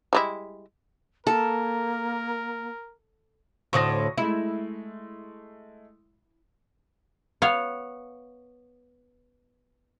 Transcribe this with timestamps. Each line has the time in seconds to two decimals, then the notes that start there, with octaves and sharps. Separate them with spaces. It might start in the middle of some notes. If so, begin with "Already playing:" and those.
0.13 G3 G#3 E4
1.27 A#3 A4 A#4
3.73 D2 A2 C5 C#6 D#6 A#6
4.18 G#3 A3 E4
7.42 B3 C#5 F5